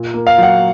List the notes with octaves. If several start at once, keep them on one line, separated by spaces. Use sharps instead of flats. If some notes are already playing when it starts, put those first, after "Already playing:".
Already playing: A#2
A#3
F5
F#3 F#5